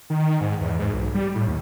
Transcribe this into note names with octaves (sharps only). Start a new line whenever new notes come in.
D#3
G#2
E2
G#2
B1
G3
A2
D#2